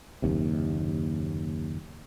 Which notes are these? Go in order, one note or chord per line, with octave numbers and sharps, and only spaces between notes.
F#1 D#2 C3